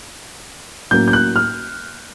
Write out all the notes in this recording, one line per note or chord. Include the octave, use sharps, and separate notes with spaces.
A2 F#3 A#3 C#4 G6
G6
F#6
F6